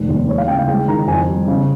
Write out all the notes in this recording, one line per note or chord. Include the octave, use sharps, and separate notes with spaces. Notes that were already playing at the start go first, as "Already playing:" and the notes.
Already playing: F1 D#3
D#2
G#3 C#5
F5
C#3 G5
F5
G#3 G5
D#3 A#5
F2 G#5
G3
C#3